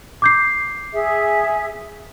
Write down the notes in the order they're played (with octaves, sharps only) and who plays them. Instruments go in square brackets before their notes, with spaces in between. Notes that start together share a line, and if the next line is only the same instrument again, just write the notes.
[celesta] D6 G6 C7
[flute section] G#4 E5